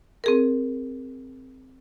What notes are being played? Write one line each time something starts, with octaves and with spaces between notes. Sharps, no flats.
C4 G#4 A#4